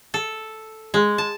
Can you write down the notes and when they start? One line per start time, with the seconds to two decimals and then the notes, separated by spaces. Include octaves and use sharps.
0.14 A4
0.94 G#3
1.18 A5